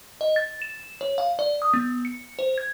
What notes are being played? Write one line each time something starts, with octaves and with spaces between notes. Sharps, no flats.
D#5
A6
E7
C#5
F5
D5
D#6
B3
C#7
C5
G#6